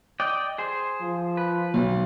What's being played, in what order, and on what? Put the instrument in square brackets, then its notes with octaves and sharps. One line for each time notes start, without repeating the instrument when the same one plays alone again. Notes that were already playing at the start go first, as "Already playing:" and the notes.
[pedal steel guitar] D5 D#5 G5
G#4 C5
[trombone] F3
[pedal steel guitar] B4
[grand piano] B1